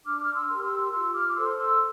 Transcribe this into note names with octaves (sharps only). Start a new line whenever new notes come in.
D4 D6 F6
F6
C6 E6
G4 A#4
F6
C6 E6
F4 C6 E6
D6 F6
D6
A4 C5 C6 E6
C6 E6